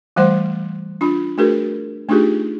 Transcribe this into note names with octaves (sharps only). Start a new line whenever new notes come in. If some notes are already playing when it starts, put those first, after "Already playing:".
E3 G3 A3 C5 F#5 C6
D4 F4 B5
A3 D4 F#4 G#4 A#4 B4
A3 D4 D#4 F4 G4 G#4